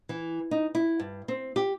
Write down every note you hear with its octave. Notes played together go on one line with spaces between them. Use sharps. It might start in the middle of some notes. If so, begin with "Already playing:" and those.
E3
D#4
E4
G2
C4
G4